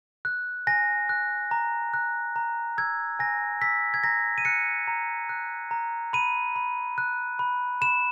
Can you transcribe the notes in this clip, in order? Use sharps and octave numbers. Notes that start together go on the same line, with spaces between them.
F#6
G#5 A#6
F#6
A#5
F#6
A#5
E6 G#6
G#5 A#6
E6 B6
G#6
A#5 A#6
D#7
F#6 C#7
A#5
F#6
A#5
B5 D#7
B5
F#6
B5
B5 E7